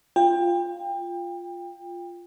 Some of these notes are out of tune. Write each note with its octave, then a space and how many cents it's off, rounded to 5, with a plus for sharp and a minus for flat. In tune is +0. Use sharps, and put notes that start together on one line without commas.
F4 +0 G5 +25